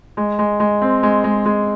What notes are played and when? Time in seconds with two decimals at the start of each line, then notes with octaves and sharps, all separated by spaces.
0.17 G#3
0.39 G#3
0.60 G#3
0.82 C4
1.03 G#3
1.24 G#3
1.46 G#3